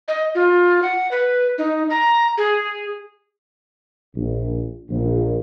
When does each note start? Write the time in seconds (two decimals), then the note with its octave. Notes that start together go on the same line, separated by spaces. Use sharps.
0.08 D#5
0.35 F4
0.83 F#5
1.11 B4
1.58 D#4
1.90 A#5
2.38 G#4
4.15 A#1
4.90 A#1